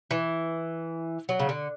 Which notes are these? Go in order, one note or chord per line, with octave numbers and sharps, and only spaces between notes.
E3
F#3
C#3
D3